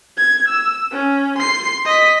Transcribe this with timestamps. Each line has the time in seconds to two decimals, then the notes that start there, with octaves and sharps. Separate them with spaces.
0.17 G#6
0.49 E6
0.92 C#4
1.38 C6 C7
1.85 D#5 B6